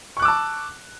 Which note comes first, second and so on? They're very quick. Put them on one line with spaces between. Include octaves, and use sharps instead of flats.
C#6 F#6 D6 E6 A5